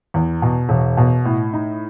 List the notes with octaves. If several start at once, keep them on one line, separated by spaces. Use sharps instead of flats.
E2
B2
E1
B2
A2
D#4